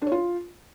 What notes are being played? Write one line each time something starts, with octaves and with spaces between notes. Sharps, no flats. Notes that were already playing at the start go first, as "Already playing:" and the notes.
D4
C#5
F4